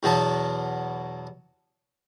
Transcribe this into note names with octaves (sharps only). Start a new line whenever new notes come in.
E2 B2 E3 F#3 B3 A5